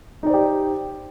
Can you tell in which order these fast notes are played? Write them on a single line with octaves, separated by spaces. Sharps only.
D#4 D5 C5 G4